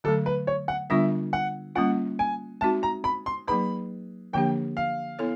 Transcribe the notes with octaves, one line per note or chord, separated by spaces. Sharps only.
D3 F#3 A3 A4
B4
C#5
F#5
D3 G3 B3 D4 F4 E5
F#5
G3 A#3 C#4 F4 F#5
G#5
G#3 C4 D#4 F#4 A5
A#5
B5
C6
F#3 A#3 D#4 G#4 B4 B5
D3 F3 A#3 D4 G4 G5
F5
B3 E4 A4 C#5